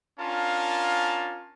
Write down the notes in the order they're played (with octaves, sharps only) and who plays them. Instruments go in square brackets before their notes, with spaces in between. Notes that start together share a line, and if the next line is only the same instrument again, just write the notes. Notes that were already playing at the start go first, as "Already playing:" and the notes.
[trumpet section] C#4 D4 F4 A#4 F5 A5